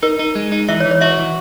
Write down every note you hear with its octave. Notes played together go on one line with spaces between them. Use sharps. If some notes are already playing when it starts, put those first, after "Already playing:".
D#4 A#4
D#4
G#3
D#4
E3 E5
C#5
E3
C#5
F#4 E5
E3